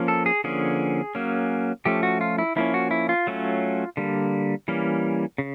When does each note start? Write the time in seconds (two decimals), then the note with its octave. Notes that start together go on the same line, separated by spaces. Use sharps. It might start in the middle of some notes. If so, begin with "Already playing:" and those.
Already playing: F3 A#3 C#4
0.08 A4
0.26 G#4
0.44 D3 F3 A#3 C#4 G#4
1.15 F#3 A#3 C#4
1.85 F3 A3 C#4 G4
2.03 F#4
2.21 F4
2.38 E4
2.56 F3 A#3 C#4 E4
2.74 F#4
2.91 E4
3.09 F4
3.27 F#3 A3 C#4
3.97 D3 G3 A#3
4.68 E3 G3 A#3 C#4
5.38 C#3